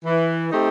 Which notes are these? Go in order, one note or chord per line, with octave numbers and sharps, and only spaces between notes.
E3
A3 C4 D#4 G4